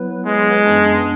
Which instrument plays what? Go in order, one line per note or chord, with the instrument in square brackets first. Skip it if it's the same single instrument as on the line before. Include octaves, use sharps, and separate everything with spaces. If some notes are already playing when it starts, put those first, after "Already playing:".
Already playing: [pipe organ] F#3 B3 E4 B4
[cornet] G#3
[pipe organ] F#2 E3 B3 D4